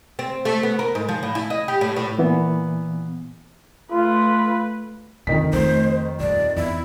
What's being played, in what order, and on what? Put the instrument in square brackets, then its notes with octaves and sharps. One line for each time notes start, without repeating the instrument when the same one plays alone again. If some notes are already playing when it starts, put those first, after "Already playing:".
[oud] C4
A3
B3
A#4
G#2
F3
A2
E4
D#5
G4
A2
A2
[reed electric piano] A#2 E3 B3
[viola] A3 B4 [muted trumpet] F4
[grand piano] F2 D#3 B6 [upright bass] D3
[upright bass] A3 [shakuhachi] C5
[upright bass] D#1 [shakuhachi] D5
[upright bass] E2 [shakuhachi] E4